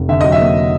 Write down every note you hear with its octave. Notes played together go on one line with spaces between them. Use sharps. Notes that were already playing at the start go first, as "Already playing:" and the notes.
Already playing: F1
D3 E5
F#3 D#5
E5
A#3